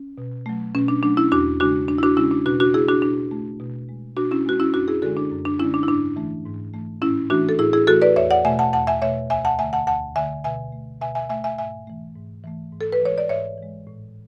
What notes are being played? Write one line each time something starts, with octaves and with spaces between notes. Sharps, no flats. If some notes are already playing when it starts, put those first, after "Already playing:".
Already playing: C#4
B2
F#3 A3
B2 C#4
D4
F#3 A3 D4
C#4 E4
E2 D4 F#4
C#3 G#3 D4 F#4
E2 D4
E4
D4 F#4
C#3 G#3 C#4 E4
D4
B2 D4 F#4
D4 F#4
A3 E4 G#4
D4 F#4
B2 D4
A3
B2
G#3
B2 D4 F#4
C#4 E4
G#3 F#4
C#4 E4
F#2 D4 F#4
E4 G#4
D3 G#3 F#4 A4
D4
F#2
D4
D3 G#3 C#4 E4
D4
E4
G#2 D4
E3 A3
G#2
E3 A3
A2 C#4 E4
E3 A3 D4 F#4
A4
A2 E4 G#4
E4 G#4
E3 A3 F#4 A4
B4 D5
E2 C#5 E5
D5 F#5
B2 A3 E5 G#5
F#5 A5
E2 F#5 A5
E5 G#5
B2 A3 C#5 E5
D2 E5 G#5
F#5 A5
D3 A3 E5 G#5
F#5 A5
D2 F#5 A5
D3 A3 E5 G#5
B2 E5 G#5
A3
B2 E5 G#5
E5 G#5
A3 E5 G#5
E5 G#5
G#2 E5 G#5
E3 A3
G#2
E3 A3
G#2
A4
B4
E3 G#3 C#5
D5
G#2 C#5 E5
E3 G#3
A2